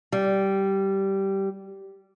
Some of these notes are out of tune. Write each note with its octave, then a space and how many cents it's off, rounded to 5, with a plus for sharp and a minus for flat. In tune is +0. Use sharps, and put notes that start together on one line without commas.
G3 -10